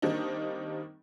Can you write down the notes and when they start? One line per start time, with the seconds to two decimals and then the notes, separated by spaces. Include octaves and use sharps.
0.02 D#3 G3 A#3 C4 D4 D#4